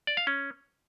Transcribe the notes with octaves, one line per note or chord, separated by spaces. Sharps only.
D5
F5
C#4